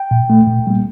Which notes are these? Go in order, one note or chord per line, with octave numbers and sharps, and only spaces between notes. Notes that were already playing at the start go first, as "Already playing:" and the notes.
Already playing: G5
A#2
A3
A#2
G3 A#3